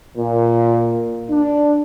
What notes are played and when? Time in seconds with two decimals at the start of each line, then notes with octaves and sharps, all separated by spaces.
0.18 A#2
1.30 D4